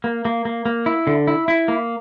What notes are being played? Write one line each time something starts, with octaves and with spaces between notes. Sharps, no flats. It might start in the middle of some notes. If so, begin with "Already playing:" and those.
A#3
A#3
A#3
A#3
E4
D3
E4
E4
A#3